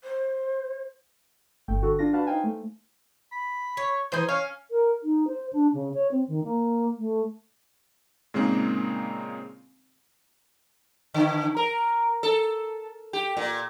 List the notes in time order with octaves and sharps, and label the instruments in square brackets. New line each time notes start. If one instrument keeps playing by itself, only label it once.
[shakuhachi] C5
[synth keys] G1 A3 G5
D3 F#4 A4
D4 F4 A#6
D4 F#4 B4 F5 A5
D#4 C5 F5 G5 G#5
A3
[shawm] B5
[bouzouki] C#5
[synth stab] E3 C5 G6 [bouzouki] D#4 G#4
[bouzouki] C#4 [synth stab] C#5 [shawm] F5
[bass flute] A#4
D#4
C5
D4
C#3
C#5
C4
D#3
A#3
A3
[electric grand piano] A#2 C#3 G#3 A#3 C4 D#4
[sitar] D3
A#4
A4
G4
A#2